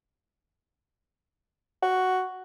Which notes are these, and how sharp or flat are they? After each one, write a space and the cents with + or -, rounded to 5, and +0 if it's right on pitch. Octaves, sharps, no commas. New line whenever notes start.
F#4 +5